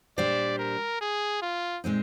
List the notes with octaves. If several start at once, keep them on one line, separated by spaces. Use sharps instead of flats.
A#2 G3 D4 G4 C5 D5
A#4
G#4
F4
A#2 G#3 C4 D#4